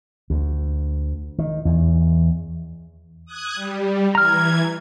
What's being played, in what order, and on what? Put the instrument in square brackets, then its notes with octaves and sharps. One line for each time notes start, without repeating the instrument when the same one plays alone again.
[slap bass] D2
D#3
E2
[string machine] D#6 F#6 G#6
G3
[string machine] E3 G#6 [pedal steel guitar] A#5 F6